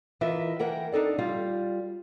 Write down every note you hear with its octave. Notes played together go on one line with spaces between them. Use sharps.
E3 E4 F4 A#4 D#5 E5
E3 A#4 F#5 G5
D4 D#4 A4 D5
G3 F4